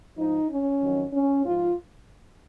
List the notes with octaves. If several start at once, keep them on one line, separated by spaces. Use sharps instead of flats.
G#2 F3 D#4
C#4
F2 D#3 F#3
C#4
G#2 F3 F4